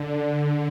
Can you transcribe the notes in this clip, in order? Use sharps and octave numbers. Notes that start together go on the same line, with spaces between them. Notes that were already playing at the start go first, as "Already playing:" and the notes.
Already playing: D3